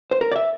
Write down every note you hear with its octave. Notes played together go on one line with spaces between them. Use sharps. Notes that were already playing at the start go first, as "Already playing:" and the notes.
C5
A#4
D5
E5